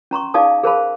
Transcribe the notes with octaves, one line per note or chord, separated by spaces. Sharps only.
C#4 A#5 C6 C#6
D#4 G#4 D5 F5 A5 D#6
G#4 A#4 C5 F5 A5 B5